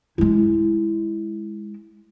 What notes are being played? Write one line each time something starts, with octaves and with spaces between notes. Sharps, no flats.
G#3 E4